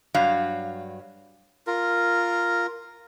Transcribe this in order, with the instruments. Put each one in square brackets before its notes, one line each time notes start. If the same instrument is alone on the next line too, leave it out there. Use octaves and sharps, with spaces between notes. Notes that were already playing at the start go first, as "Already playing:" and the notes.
[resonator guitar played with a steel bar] G2 F#3 F5
[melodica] F4 A#4